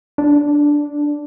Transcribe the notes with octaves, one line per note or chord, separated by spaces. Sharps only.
D4